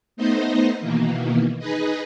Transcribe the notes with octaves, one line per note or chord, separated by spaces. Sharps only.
A3 B3 D#4 C5 D#5
B2 D#3 E3 A#3
D#4 G#4 B4 D#5